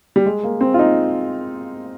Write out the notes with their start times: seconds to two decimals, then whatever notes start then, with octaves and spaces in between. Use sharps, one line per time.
0.16 G3
0.26 G#3
0.43 A#3
0.61 C4
0.74 F4
0.79 D#4